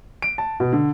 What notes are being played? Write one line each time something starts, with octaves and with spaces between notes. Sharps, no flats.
D7
A5
B2
D3